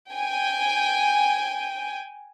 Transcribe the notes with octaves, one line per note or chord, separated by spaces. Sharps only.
G5 G#5